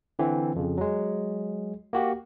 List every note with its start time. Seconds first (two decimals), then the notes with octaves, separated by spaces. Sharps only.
0.19 D3 E3 C4
0.56 F2 C#3
0.78 F#3 G#3
1.93 A#3 F#4 G4